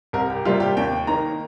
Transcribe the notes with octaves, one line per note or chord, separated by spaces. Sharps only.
C2 A#4
G4
C3 G3 A#3 F4
G4
D#2 G5
D#3 A#3 A#5